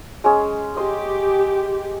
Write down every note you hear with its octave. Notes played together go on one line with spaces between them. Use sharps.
G#3 C#4 G#4
G4 D#5 C6